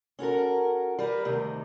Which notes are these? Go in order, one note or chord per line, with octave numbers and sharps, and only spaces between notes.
C#4 F#4 A4 A#4
G3 A#4 B4
D2 C3 D#3